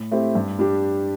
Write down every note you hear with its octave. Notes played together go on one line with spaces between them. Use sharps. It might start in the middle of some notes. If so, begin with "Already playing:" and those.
Already playing: A2
A3 C4 E4 G4
G2
G3 D4 G4